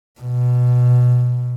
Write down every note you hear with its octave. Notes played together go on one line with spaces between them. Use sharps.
B2